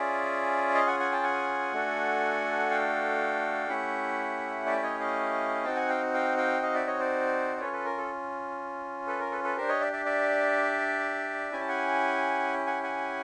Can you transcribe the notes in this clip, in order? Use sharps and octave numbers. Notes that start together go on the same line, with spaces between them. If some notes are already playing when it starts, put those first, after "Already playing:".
Already playing: C#4 F4 G#4 D5 E5
D#5 F5
F#5 G#5
F#5 G#5
G5 A5
F#5 G#5
A3 D4 F#4 A4
F5 G5
A3 C#4 E4 G4 E5 F#5
D5 E5
C#5 D#5
D#5 F5
C4 D#4 F#4 G5 A5
F#5 G#5
F5 G5
F5 G5
F5 G5
D#5 F5
D5 E5
C#5 D#5
C5 D5
D5
C#4 F4 A4 B4 C#5
A4 B4
A#4
A4
A4 B4
A#4
A4 B4
A4 B4
D4 G4 A#4 C5
C#5 D#5
D5 E5
D5 E5
D5 E5
C#4 E4 G4 G#5
A5
F#5 G#5
F#5 G#5
F#5 G#5